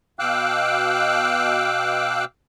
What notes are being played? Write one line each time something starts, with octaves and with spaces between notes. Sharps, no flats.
B2 F5 G5 D6 E6 F#6